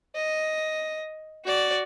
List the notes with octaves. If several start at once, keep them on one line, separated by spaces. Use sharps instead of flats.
D#5
F#4 D5